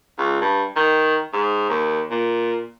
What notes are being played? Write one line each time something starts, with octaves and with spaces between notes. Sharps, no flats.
C#2
G2
D#3
G#2
D#2
A#2